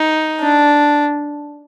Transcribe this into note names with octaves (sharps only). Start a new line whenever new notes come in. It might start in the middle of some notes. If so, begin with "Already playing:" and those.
Already playing: D#4
D4